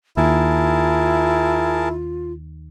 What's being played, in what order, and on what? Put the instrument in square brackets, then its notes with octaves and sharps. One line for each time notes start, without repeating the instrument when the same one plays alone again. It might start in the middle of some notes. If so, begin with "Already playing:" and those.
[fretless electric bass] D#2 [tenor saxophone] E4 [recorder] F4 [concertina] G#4 A#4 A5